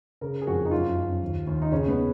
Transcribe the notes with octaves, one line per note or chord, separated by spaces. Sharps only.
C#3 A#4
G#4
F2 F#4
D#4
F#2 F4
F#2
D#2
D#2
D#4
C#3 C#4
B3
C#3